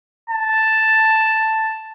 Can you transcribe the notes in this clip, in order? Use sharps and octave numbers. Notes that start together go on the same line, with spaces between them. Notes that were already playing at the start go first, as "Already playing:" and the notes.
A5